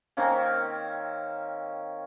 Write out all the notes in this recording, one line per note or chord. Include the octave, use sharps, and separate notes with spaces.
D#3 A#3 C4 C#4